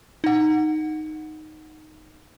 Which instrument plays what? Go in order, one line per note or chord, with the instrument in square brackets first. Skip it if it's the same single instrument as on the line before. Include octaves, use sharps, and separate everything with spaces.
[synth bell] D#4 F#5